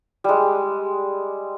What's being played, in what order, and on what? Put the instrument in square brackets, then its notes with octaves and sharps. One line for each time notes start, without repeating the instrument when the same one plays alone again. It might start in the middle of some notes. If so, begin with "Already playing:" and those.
[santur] G3 G#3